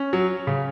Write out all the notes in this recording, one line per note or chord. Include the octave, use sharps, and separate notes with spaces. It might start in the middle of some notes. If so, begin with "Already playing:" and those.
Already playing: C#4
F#3
C#3